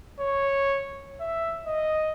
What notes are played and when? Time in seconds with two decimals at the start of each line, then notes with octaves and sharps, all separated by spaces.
0.20 C#5
1.20 E5
1.66 D#5